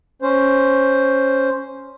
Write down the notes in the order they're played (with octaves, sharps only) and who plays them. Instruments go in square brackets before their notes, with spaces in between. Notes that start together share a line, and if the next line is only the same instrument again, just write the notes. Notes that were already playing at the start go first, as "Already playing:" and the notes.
[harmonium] C#4 C5